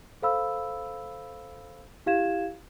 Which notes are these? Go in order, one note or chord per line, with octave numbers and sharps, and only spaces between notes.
A4 C5 F5 B5 E6
E4 G4 F5 G#6 E7